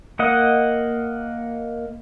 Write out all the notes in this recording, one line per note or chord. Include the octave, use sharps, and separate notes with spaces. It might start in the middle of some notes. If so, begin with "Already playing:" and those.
A#3 D#5 F#5